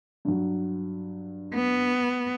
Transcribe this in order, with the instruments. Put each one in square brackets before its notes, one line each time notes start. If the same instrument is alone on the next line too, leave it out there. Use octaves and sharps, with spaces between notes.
[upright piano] G2 F#3
[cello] B3